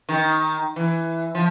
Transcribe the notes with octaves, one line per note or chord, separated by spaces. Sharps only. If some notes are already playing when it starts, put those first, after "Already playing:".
D#3
E3
F3